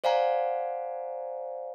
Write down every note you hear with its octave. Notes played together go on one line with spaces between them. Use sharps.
C5 D5 F5 F#5 G#5 A#5